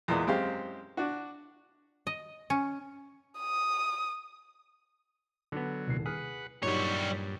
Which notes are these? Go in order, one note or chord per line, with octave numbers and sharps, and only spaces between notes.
E2 A#2 G#3 B3
F#2 G#3 C4 G4 F5
D4 F#4
D#5
C#4
D#6
D3 F#3 B3 D4 A4
D#1 C2 C7
G#4 B4 F#5 F6
G2 A#2 F#3 G3 D#4 G4 C#5